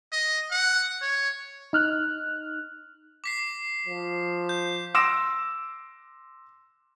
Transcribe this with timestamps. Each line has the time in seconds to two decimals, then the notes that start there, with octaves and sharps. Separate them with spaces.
0.12 D#5
0.51 F#5
1.02 C#5
1.73 D#4 F6 F#6
3.24 D6 B6 C7
3.86 F3
4.49 G6
4.94 C6 D6 E6 A#6 E7